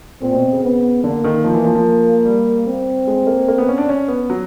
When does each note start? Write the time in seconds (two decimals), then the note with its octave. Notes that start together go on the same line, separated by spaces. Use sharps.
0.22 A#2 C4
0.33 B2
0.53 C#3
0.63 B3
1.04 D3 A#3
1.24 D#3
1.44 F3
1.54 E3
1.64 F3
1.75 F3
2.25 G3
2.67 C4
3.07 G#3
3.27 A#3
3.48 A#3
3.58 B3
3.68 C#4
3.78 D4
3.89 C#4
4.08 B3
4.30 F#3